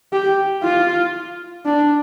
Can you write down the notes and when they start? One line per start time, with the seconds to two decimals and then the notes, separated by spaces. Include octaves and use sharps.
0.13 G4
0.63 F4
1.65 D4